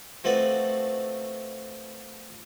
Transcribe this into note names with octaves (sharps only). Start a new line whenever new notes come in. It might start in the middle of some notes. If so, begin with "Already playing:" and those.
F3 A3 C4 F#4 B4 D5